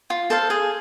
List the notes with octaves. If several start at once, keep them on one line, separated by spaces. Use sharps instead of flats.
F4
A4 C5 F5
G#4